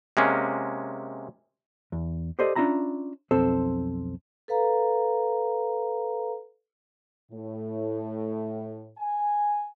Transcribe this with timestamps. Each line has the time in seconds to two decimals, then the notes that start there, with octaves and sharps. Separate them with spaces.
0.17 C3 G#3 A#3 C#4
1.92 E2
2.39 G4 A4 C5 D5 D#5
2.56 C#4 D4 F4 E5 A#5 B5
3.31 B1 F2 C4 A4 C5
4.48 A4 B4 F5 A#5
7.32 A2
8.98 G#5